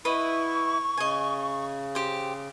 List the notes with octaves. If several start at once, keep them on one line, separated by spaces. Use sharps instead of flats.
E4 B4 D#5 F#5 C#6
C#3 D#5 G#5
G4 C5